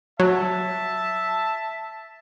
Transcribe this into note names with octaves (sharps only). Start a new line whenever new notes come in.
F#3 E5 A5